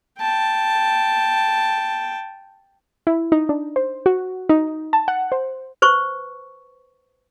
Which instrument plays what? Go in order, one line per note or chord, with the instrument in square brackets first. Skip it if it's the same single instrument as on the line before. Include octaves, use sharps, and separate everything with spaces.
[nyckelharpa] G5 A5
[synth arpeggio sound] E4
D#4
D4
C5
F#4
D#4
A5
F#5
C5
[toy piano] B4 C5 C#6